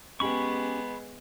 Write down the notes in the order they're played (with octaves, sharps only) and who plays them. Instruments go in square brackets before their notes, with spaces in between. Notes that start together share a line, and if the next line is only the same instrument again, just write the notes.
[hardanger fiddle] G#3 B3 [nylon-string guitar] C#4 G4 G5 [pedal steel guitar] B5 C#6